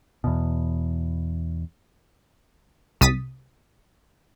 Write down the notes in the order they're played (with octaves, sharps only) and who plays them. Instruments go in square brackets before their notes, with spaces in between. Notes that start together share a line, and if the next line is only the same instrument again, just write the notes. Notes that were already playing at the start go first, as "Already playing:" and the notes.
[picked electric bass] E2 B2
[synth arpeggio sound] C2 D#6 A6 B6